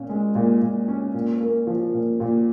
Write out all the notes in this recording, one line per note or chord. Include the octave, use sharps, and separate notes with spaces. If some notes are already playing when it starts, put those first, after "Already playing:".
Already playing: A#2 C#4
G#3
A#2
A#2
C#4
A#2
A#3
F3
A#2
A#2